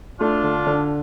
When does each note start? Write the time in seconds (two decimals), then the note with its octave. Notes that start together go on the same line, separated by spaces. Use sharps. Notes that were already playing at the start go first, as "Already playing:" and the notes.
0.20 A3 D4 F4
0.44 D3
0.67 D3